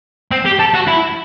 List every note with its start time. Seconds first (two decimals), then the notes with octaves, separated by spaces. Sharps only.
0.31 C4
0.46 G4
0.59 A4
0.74 F#4
0.87 E4